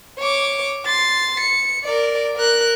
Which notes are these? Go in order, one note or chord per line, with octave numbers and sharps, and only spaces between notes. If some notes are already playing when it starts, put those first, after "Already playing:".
C#5 D6
C6 A6
C#7
A#4 D5
A#4 F#6